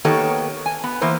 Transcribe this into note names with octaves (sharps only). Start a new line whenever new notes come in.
D#3 A#3 B3 G4 A4 C#5
G#5
B3
E3 A#3 B3 C5